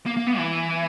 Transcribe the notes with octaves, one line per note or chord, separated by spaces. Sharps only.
A#3
A#3
B3
E3